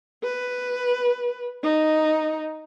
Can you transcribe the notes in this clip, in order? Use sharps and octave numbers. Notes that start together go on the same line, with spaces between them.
B4
D#4